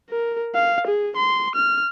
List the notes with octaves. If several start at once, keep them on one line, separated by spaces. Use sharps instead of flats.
A#4
F5
G#4
C6
F6